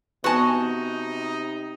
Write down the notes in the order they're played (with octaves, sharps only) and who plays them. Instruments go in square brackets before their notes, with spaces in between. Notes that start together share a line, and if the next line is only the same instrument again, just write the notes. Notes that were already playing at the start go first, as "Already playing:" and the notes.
[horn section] C3 D#4 [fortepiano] B3 G#5 [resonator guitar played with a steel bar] F#4 A5